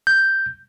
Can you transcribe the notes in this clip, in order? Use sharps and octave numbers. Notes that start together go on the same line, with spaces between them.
G6